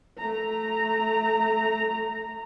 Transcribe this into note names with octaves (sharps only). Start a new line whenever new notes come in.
A3 A#5